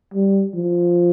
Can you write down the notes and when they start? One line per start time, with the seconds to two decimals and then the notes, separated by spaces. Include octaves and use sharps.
0.14 G3
0.55 F3